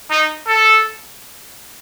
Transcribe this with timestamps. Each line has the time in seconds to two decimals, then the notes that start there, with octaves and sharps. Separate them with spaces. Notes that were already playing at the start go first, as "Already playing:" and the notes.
0.10 D#4
0.47 A4